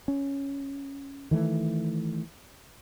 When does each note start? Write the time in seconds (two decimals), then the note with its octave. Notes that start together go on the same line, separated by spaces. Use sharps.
0.08 C#4
1.31 D#3 E3 A3